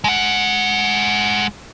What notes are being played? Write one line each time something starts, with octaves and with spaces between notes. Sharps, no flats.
G#3 F#5